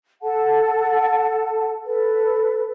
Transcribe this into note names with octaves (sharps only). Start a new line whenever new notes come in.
A4 F#5 A5
A4 B4